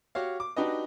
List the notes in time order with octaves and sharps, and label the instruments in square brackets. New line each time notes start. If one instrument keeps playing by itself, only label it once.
[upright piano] F#4 G4 C#5 F5
D6
D4 D#4 F#4 G4 B4 D#5